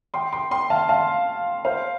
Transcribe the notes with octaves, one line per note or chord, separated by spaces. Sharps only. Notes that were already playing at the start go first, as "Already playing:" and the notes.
G5 C6
G5 C6
G5 C6
F5 A5
F5 A5
C5 F5